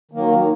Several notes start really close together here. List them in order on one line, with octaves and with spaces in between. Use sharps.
D#3 A#3 F#3